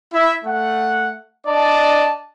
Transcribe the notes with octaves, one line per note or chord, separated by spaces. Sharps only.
E4 E5
A3 F#5
D4 D5 D#5 A5